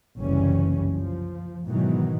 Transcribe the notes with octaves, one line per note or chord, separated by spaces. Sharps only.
F#1 C2 G2 E3 G3 C#4
F3
G#2 B2 D#3 E3 F#3